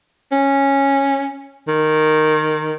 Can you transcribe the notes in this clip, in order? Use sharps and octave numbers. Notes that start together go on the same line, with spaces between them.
C#4
D#3